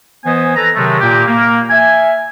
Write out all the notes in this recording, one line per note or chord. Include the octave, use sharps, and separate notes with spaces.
E3 B3 C5 D#5 G#5
A4 B4 A#5
C3 D#3 F#3 G#3 A3
A#2 A#3 G4
A#3
E5 G#5